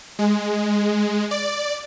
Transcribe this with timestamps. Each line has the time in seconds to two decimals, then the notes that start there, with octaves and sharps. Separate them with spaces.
0.19 G#3
1.31 D5